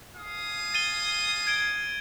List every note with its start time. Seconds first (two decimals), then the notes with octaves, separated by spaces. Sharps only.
0.16 F5 G#5 D#6
0.74 A6 D#7 G7
1.47 G#6 D7 G7